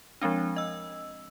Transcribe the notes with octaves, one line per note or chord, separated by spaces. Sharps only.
F3 G#3 C4 D4
D#5 E6